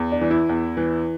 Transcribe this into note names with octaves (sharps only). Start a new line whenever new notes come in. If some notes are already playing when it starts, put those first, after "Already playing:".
Already playing: E2
D4
E3
E4
E2
E3